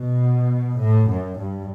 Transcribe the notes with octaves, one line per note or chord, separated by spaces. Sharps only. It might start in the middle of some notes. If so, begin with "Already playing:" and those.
Already playing: B2
A2
F#2
G2